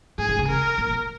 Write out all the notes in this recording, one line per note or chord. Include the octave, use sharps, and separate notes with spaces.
G#2 G#4
G#2
C#3
A#4
A#2